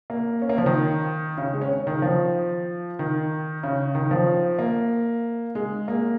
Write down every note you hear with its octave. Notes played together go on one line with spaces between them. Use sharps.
A#3
C#4
A#3
F3
D#3
C#3
G#3
C#4
D#3
F3
D#3
C#3
D#3
F3
A#3
G#3
A#3